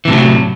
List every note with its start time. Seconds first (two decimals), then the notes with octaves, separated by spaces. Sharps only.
0.05 E3
0.08 C3
0.10 A2
0.13 F#3